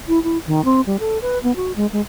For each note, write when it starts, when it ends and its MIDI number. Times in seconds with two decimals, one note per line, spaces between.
0.08 0.22 64
0.23 0.38 64
0.47 0.64 51
0.65 0.81 60
0.86 0.96 55
1.00 1.20 69
1.22 1.38 71
1.43 1.54 59
1.56 1.72 66
1.76 1.86 56
1.92 2.01 56